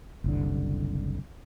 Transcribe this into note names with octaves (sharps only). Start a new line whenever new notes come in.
F#1 C2 D3